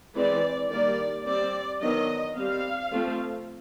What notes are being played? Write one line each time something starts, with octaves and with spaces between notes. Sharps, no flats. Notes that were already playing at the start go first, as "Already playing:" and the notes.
E3 G#3 C4 D5
D#3 G3 A#3 D5
G3 C4 D5
D#3 F#3 B3 D4 D#5
G3 C4 F5
F3 A3 C4